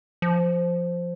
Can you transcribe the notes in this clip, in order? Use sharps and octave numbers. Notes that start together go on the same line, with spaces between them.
F3